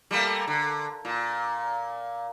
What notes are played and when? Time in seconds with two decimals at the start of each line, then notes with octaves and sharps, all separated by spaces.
0.11 G3 A3 A#3
0.48 D3
1.05 A#2